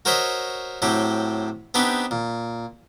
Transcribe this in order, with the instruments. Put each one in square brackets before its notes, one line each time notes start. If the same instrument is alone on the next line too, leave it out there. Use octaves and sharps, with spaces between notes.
[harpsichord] F#4 A#4 C5 C#5 D#5 E5
A2 F#3 C4 G4
B3 C4 D4 D#4 G4 B4
A#2